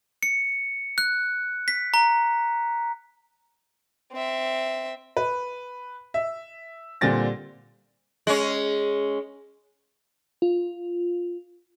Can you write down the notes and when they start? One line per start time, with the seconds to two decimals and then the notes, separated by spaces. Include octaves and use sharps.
0.23 C#7
0.98 F#6
1.68 B6
1.94 A#5
4.12 C4 E5
5.17 B4
6.14 E5
7.01 A#2 D3 G3 C4 A6 A#6
8.27 G#3 C#4
10.42 F4